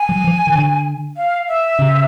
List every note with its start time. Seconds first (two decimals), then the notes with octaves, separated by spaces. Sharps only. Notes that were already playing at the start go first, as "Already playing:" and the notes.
Already playing: G#5
0.09 F#3
0.24 F3
0.47 D#3
0.55 D3
1.17 F5
1.48 E5
1.79 C#3